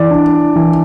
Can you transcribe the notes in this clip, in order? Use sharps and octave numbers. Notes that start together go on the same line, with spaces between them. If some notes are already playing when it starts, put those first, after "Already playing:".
Already playing: E3 D5
D4
E3